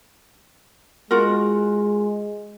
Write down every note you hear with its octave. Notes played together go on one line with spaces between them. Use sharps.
G#3 F4 F#4 A#4